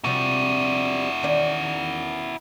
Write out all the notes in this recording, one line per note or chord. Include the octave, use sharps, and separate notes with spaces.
C3 F3 G3 E4 F#4
D#3 C#4 D5